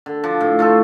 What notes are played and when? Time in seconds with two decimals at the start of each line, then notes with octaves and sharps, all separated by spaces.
0.06 D3
0.24 F3 D4
0.41 A2
0.59 A3 F4 A4